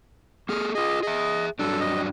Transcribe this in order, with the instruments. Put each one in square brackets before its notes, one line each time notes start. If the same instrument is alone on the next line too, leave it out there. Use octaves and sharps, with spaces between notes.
[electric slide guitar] A#3 G#4 A4 [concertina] F6
[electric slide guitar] F4 G#4 [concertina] D#5
[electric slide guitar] G#4 E5 [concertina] D#5
[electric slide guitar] G2 F#3 D4 [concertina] A4
[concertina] D#5